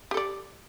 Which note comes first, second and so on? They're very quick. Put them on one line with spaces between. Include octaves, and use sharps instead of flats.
G4 A4 D5